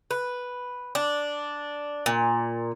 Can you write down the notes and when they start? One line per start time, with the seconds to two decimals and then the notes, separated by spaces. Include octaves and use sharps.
0.11 B4
0.95 D4
2.06 A#2